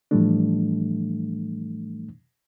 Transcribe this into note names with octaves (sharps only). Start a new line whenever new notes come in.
A2 E3 F3 G3 A3 D4